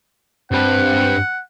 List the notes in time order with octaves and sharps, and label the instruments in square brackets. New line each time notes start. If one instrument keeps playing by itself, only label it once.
[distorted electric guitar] G2 B4 [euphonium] C4 [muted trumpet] F#5